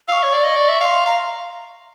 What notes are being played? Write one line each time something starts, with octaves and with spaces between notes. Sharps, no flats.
F5 C#6 E6
C#5
D5
D#5
D5
E5
F5 C6 C#6
F5 A#5